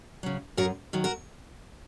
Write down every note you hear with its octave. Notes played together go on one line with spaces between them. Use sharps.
C#3 F#3
F#2 F#4 A#4
D#3 F#3
F#4 A#4